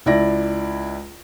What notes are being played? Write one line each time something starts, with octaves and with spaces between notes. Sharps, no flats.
C#2 E4 D5 A#6